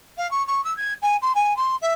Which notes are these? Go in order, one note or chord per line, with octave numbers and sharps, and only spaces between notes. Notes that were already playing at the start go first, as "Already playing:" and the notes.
F5
C#6
C#6
E6
G#6
G#5
C6
G#5
C6
E5